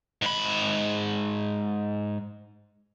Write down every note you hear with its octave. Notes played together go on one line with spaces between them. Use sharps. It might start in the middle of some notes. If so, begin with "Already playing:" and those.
G#2 B5